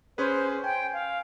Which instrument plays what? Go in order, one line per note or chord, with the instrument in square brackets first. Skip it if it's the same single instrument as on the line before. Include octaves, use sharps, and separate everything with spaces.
[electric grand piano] C#4 G#4 B4 [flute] C5
[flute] G5 [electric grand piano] G#5
[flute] F5